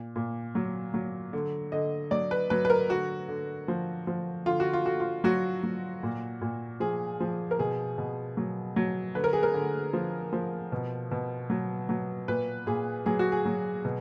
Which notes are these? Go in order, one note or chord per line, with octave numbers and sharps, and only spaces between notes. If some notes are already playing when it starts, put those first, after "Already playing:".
Already playing: A#2
A#2
F#3
F#3
D3
D3 D#5
F#3 D5
B4
F#3 B4
B4
A#4
D3 F#4
D3
F3
F3
D3 F4
F#4
F4
D3 F#4
F4
F#3 F#4
F#3
A#2
A#2
F3 G#4
F3
A#4
B2 G#4
B2
F#3
F#3
D3 B4
A#4
G#4
A#4
D3
F3
F3
B2
B2
F#3
F#3
A#2 B4
A#2 G#4
F#3 G#4
F#4
G#4
F#3
B2